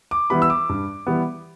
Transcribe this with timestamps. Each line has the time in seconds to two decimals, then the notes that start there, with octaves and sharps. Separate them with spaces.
0.11 D6
0.30 E3 G3 B3 B5
0.42 E6
0.50 D6
0.69 G2
1.07 E3 G3 B3